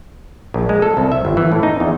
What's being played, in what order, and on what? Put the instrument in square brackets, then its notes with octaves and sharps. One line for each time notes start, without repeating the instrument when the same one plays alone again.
[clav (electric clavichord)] A#1
G#3
A4
C2
E5
G1
E3
A2
D#4
E2